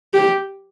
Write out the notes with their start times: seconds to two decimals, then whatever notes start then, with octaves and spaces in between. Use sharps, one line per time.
0.14 G4